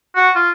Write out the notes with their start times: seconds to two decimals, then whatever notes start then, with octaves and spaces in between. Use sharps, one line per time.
0.16 F#4
0.36 F4